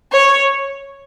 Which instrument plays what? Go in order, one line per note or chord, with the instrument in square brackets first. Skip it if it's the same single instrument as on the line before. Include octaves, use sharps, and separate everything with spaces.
[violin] C#5